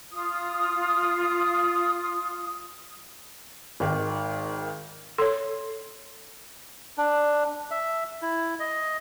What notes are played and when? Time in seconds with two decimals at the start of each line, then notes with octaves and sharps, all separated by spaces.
0.13 F4 D#6
3.80 G#1 D#3
5.18 A4 C#5 C6
6.98 D4
7.71 E5
8.22 E4
8.60 D#5